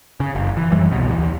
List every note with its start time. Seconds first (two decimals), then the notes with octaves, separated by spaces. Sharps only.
0.20 C#3
0.35 F#1
0.57 E3
0.72 F#2 E3 G3
0.91 C2 B2
1.09 D#2 E3